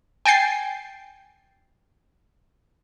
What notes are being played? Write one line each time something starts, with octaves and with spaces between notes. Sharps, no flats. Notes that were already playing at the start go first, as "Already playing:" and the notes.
G5 G#5 A6 C7